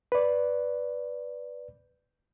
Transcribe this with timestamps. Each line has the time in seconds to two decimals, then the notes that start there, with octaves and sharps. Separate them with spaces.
0.12 B4 D5